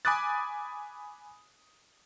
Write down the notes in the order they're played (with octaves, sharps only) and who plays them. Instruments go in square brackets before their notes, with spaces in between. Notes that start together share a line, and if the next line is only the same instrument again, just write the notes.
[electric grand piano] G#5 B5 D6 D#6 F#6 A6